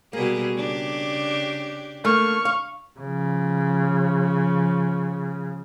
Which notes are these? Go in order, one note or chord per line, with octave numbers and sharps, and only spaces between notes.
B2 G3 A#3 G#4
C#3 D4 G4
A3 A#3 C#6 F6
F5
C#3 F3